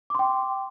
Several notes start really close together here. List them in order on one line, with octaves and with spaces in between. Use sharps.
D6 C6 G5